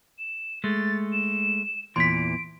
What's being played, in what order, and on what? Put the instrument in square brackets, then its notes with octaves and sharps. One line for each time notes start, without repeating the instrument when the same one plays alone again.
[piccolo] E7
[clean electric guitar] G#3 A3 [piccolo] A6
[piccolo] E7
[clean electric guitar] E2 A#2 E3 [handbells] C6 B6 [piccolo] D7